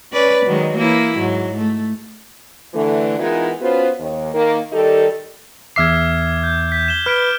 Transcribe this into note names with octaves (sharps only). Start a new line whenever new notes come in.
C#4 B4 D5
D#3 F#3 G#3
E3 A#3 E4
G#2 F#3
A3
D3 E3 A3
E3 G#3 B3 D#4 F4 A#4
B3 C#4 F4 F#4 B4 C5
D#2
D#3 A#3
D#3 G3 D#4 G4 A4
E2 E5 D6 F6 G#6 C7
G6
G6 B6
E7 G7
B4 F6 B6 D7